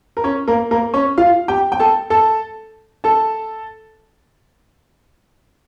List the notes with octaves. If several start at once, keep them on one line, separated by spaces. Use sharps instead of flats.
A#4
C#4 C#5
A#3 A#4
A#3 A#4
C#4 C#5
F4 F5
G4 G5
G5
A4 A5
A4 A5
A4 A5